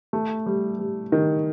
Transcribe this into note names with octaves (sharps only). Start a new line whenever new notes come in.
A3
G3
G3
D#3